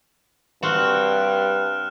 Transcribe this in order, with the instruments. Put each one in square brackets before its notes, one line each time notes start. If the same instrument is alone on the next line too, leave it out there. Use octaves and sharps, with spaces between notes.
[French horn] G2 [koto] C4 F#4 [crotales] F6 F#6 E7